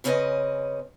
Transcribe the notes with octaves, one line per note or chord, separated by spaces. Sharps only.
C#3 C4 C#4 E4 B4 D#5